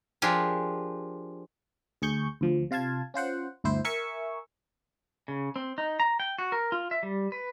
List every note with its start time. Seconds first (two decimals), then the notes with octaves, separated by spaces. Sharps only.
0.22 F3 D4 G4 G#4 A#4
2.02 D2 G#4 C#6 G6
2.41 D2 F3
2.71 C3 F4 F5 A5 G#6
3.14 C#4 F4 C5 F#5
3.64 G1 D2 E4 C5
3.85 A#4 E5 G#5 C#6 E6
5.28 C#3
5.56 C4
5.78 D#4
6.00 A#5
6.20 G5
6.39 F#4
6.52 A#4
6.72 F4
6.91 E5
7.03 G3
7.32 B4